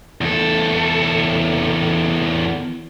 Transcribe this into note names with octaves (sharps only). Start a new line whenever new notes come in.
E2 A4